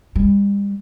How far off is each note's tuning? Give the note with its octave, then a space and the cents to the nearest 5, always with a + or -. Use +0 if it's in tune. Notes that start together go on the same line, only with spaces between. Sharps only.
G3 +40